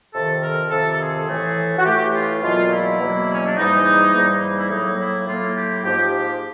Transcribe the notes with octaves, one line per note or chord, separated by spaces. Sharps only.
F2 C3 D#3 A4
A#4
F2 C3 D#3 A4
A4
G#4
A2 E3 A3
F#4
A2 E3 A3 G4
F4
E2 B2 F#3 A#3 F4
E4
E2 B2 F#3 A#3
C#4
D4
G#2 E3 G3 A#3 D#4
G#2 E3 G3 A#3
E4
A2 F#3 A#3 D#4
E4
A2 F#3 A#3 F4
G4
G#2 F3 A#3 G4
G4